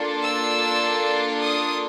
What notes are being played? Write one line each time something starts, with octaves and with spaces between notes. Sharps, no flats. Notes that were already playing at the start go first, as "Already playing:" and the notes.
Already playing: A#3 D4 F4 A4
E6
D#6